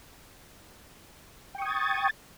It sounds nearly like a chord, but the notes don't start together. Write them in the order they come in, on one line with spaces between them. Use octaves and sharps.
G5 C#6 D#6 G#6 A6